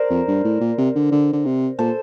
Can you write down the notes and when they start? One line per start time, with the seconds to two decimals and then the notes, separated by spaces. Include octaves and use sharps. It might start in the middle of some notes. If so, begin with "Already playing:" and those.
Already playing: A#4 C5 D5
0.10 F2
0.27 G2
0.44 A2
0.61 A#2
0.78 C3
0.95 D3
1.12 D3
1.33 D3
1.45 C3
1.79 A#2 A4 C5